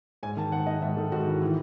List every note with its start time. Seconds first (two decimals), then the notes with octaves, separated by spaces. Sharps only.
0.23 G#2 G#5
0.37 D#3 A5
0.52 G#2 F#5
0.67 D#3 D#5
0.82 G#2 E5
0.97 D#3 A4
1.12 G#2 F#4
1.27 D#3 E4
1.41 E3 E4